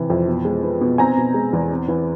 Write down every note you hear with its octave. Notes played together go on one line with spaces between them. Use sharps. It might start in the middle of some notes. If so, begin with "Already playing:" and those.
Already playing: C3 E3
F2
B2
G#3
B3
B2
C4 G#5 A#5
B2
G#3
E2
C4
E3